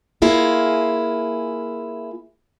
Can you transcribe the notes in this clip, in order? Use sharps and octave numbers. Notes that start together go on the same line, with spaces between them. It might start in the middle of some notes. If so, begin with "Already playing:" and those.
A#3 E4 F4 G#4